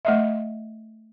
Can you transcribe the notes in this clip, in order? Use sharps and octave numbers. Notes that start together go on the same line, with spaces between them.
A3 D#5 E5